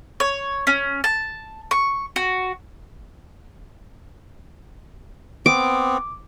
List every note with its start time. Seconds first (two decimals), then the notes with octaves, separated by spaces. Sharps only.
0.20 C#5
0.67 C#4
1.04 A5
1.71 C#6
2.16 F#4
5.46 B3 C4 D6